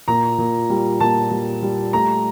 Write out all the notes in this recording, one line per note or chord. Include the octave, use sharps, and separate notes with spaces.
A#2 A#5
A#2
G3
A#2 A5
G3
G3
A3 A#5